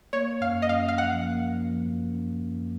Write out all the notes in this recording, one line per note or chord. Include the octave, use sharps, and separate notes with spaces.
A#3 C#5
F#2 F5
D#5
F#2 F5
F5
F3 F#5
A#3
F3
F#2
F#2
F#2